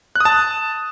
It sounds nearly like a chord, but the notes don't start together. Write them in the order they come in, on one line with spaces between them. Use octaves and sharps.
F#6 D#6 A5